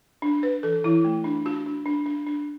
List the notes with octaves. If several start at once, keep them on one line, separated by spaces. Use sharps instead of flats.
D4
D4 B4
E3 A4
E3 E4
A3
D4
D4 F#4
D4
D4
D4
D4